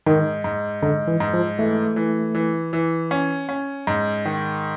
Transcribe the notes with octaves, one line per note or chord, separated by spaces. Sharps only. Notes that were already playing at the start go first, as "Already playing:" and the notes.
G#2 D#3
G#2
G#2 D3
E3
G#2
F3
E3 A3
E3
E3
E3
C#4
C#4
G#2
D#3